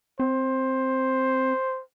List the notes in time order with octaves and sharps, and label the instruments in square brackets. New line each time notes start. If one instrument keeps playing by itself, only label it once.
[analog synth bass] C4 [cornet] C5